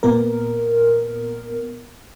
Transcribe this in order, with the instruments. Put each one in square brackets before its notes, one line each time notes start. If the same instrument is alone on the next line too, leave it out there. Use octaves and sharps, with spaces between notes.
[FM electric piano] A#2 B3 A#4